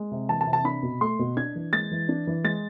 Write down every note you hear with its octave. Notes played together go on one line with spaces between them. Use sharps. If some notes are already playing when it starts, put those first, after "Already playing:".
Already playing: G#3
C3
E3 A5
A5
C3
A5
D4 B5
B2
A3 C6
B2
D4 G#6
E3
G#3 A6
E3
D4
E3
G#3 A6